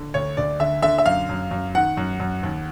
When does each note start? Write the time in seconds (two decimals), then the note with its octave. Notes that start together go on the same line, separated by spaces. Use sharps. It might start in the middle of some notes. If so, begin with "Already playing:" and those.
Already playing: D3
0.14 D2 C#5
0.37 D2 D5
0.60 D3 E5
0.82 D3 E5
0.98 E5
1.05 F#2 F5
1.29 F#2
1.51 F#2
1.75 D#3 F#5
1.97 F#2
2.20 F#2
2.43 D#2